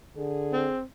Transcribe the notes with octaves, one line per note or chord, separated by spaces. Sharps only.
D3 G#4
C4